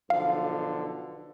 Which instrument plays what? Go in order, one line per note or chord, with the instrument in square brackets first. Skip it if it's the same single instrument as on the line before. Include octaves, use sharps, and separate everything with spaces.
[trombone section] B1 D3 F3 [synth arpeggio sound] F5